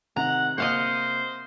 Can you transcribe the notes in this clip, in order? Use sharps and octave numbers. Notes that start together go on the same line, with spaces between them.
C3 D#3 F#5 A#5
C3 A#3 C5 D#5 F5 F#5